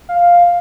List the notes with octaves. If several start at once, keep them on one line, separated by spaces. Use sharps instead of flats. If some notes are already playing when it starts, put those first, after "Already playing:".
F5